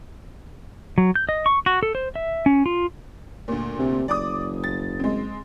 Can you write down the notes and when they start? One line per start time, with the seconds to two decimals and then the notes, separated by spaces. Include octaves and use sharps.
0.98 F#3
1.16 G6
1.29 D#5
1.46 C#6
1.66 F#4
1.83 A4
1.95 C5
2.16 E5
2.46 C#4
2.66 F4
3.48 D2 A#2
3.79 C3
4.08 F#1 D5 D6 D#6
4.64 A6
5.00 G#3 C4